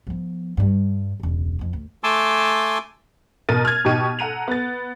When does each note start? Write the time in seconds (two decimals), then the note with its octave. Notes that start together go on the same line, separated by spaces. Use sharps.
0.07 F3 B3
0.57 G2 G3
1.20 E1 C#2
1.59 F2 F3
1.73 D2
2.04 A3 G#5 A5 C6 D6 E6
3.49 B2 A#4 A6 D#7
3.65 F6 G#6
3.85 B2 D#4 G4 C#6 D#7
4.19 A4 F#5 A#5 D#7 F7
4.48 B3 A6